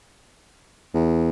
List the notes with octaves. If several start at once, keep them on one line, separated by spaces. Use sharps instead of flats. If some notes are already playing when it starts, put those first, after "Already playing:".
E2